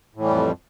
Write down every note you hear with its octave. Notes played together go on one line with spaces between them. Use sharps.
F2 A2 E3 G3